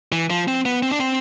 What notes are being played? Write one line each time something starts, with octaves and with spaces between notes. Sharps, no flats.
E3
F3
C4
B3
C4
D4
C4